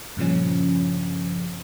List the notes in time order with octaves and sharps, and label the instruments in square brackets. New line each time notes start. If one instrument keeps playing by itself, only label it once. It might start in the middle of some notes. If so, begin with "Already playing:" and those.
[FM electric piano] G2 A#2 C#3 F3 C#4